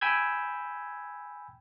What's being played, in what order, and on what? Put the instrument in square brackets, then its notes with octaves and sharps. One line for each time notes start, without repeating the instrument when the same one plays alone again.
[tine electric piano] G5 G#5 B5 E6 G6 G#6